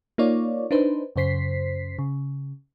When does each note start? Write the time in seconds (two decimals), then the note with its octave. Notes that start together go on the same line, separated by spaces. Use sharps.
0.18 A#3 D#4 F4 C#5 D5
0.71 D4 D#4 B4 C5
1.16 F#2 C#3 C5 B6 C7
1.99 C#3